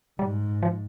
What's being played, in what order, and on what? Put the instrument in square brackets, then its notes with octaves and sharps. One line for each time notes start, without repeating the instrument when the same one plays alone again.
[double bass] G#2 [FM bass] G3
[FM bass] F3